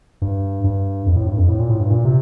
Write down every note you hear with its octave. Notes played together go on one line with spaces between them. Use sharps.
G2
G2
F2
A2
G2
F2
A2
A#2
A2
G2
A#2
C3